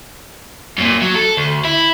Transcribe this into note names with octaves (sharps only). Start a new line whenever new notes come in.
F#2 A#2
F#3
A4
D2
E4